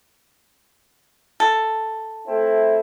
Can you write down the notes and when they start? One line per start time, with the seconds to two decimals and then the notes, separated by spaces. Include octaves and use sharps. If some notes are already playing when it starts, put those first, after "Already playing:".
1.40 A4
2.27 A3 C4 E4